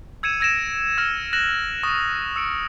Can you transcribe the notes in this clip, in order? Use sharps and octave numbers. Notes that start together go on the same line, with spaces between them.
E6 G#6 C#7 D#7 E7
E6 G#6 A#6 D7 E7
E6 F6 A#6
F#6 A#6 E7 F#7
C#6 D#6 A6 E7
E6 C#7 D7